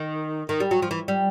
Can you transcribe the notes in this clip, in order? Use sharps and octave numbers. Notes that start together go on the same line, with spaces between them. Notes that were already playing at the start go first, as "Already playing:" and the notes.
Already playing: D#3
D#3
G3
F#3
F3
E3
G3